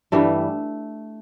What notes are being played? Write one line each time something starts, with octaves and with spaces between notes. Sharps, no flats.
G2 E3 G3 A3